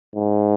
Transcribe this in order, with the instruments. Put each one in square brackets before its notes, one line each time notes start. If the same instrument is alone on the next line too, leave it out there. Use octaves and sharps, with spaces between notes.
[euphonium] G#2